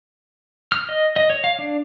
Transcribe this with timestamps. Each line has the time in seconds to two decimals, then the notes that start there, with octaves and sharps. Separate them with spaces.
0.72 F6
0.89 D#5
1.16 D#5
1.30 C#5
1.44 F5
1.59 D4